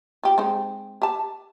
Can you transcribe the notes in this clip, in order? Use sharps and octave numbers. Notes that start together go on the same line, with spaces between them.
F4 G4
G#3 C4 D#4
G4 A5